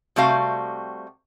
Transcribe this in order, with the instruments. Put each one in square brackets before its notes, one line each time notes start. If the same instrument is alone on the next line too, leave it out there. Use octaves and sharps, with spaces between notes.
[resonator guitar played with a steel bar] C3 G3 A3 F#4 F5